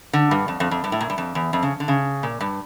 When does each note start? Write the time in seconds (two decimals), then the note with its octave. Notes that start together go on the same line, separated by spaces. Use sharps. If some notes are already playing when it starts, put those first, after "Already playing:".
0.13 D3
0.31 G2
0.48 F2
0.60 F2
0.71 F2
0.84 G2
0.92 A2
1.01 A#2
1.10 G2
1.18 F2
1.35 E2
1.53 F2
1.63 C#3
1.80 D3
1.88 C#3
2.23 A#2
2.41 G2